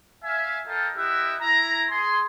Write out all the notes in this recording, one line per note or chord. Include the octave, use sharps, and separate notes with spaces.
E5 F5 G#5
F4 A4 A#4 D#5 F5 G5
E4 G4 D#5 E5 F#5
E4 A#5
G#4 C6